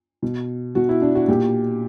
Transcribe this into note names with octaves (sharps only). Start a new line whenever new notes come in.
B2
B2 F#4
E4
D4
F#4
A#2 G4